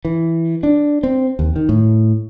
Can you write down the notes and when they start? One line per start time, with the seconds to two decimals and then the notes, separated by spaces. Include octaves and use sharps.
0.05 E3
0.63 D4
1.03 C4
1.39 D#2
1.56 D#3
1.69 A2